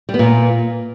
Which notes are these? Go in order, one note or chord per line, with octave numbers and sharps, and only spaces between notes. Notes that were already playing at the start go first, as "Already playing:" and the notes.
G3
B3
A#2